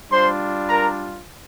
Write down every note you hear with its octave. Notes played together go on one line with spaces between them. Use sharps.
G3 D4 F4 C5 C6
A#4 A#5